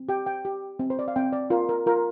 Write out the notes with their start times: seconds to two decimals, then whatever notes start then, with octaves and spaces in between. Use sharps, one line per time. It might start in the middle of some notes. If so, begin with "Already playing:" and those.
Already playing: C4
0.09 G4 G5
0.26 G5
0.45 G4
0.79 C4
0.90 C5
0.99 D5
1.08 F5
1.16 C4 G5
1.33 D5
1.50 F4 A#4
1.69 A#4
1.86 F4 A#4